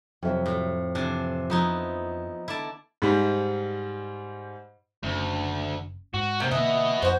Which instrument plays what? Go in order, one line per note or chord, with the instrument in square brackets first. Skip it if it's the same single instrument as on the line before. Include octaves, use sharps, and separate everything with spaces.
[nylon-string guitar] F2 E5 [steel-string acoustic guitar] C3 F#3
[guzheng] A2
[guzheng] C3 D4 [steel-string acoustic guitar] E3 C5
[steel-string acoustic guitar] F3 [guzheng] B3 D#4 E4
[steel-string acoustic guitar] D3 [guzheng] E4 D5 A5
[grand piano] G#2 G3
[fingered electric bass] F#1 C#4 [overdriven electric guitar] D2
[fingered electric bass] G#2 [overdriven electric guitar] F#4
[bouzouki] C3 [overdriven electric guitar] A#3 C4
[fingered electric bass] B2 D3 A#3 [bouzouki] E3 [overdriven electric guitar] B3 D#5
[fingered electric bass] F2 [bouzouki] F#4 C5